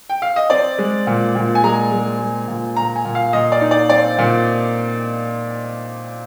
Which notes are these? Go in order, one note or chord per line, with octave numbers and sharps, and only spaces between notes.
G5
F5
D#5
C4 D5
G#3
A#2
A#2
G#5
G#3 A#5
G#3
G#3
A#2
A#2 A#5
G#5
A#2
F5
A#2 D#5
D5
D#4
D5
C4 D5
A#2